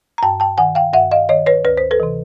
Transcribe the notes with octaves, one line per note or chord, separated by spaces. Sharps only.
A#5
G2 G5 A5
G5 A5
D#3 F#5 G#5
F5 G5
G2 E5 F#5
D#5 F5
D#3 C#5 D#5
B4 C#5
D2 B4
C5
A4 B4
C3 E3